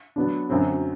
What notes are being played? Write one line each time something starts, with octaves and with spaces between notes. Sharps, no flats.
F#3 B3 D4
F#2 D3 F#3 C4 F#4